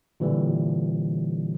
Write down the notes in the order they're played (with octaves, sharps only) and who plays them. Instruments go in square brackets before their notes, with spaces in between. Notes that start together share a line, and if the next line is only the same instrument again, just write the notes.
[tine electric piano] A#2 D3 E3 G3